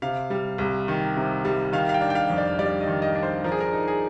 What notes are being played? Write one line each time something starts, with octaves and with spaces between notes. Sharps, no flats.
C3 F5
G3
C2
D#3
C3
G3
D#3 F5
F5
G5
D4
G5
F5
F2
D5
G3 D5
D#5
D#3
D#5
D4
C5
F3 A#4
G#4
A#4
D#4
G#4